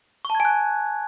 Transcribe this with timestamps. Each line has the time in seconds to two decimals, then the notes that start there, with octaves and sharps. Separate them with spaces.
0.25 C#6
0.30 A5
0.35 G#6
0.40 G#5
0.45 F#6